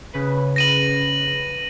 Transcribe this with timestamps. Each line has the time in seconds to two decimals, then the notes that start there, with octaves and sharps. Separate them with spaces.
0.13 C#3 B4
0.56 A#6 D#7 F#7